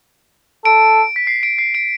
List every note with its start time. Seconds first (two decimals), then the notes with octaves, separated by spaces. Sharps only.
0.65 A4 D7
1.16 B6
1.27 C7
1.43 D7
1.58 C7
1.75 D7